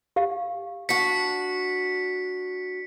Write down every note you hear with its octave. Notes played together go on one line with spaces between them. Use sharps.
G4 F5
D4 F#4 B6 C#7